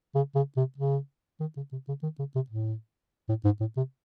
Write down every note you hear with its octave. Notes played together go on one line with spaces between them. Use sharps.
C#3
C#3
C3
C#3
D#3
C#3
C3
C#3
D#3
C#3
C3
A2
A2
G#2
A2
C3